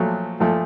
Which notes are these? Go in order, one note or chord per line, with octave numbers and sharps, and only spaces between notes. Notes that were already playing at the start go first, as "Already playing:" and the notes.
Already playing: A#2 F3 F#3 A3 F#4
A#2 F3 A3